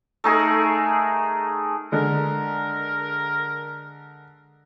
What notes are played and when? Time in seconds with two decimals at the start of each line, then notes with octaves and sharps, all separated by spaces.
0.24 A3 D#4 G#4 A#4
1.92 D3 G#3 A#4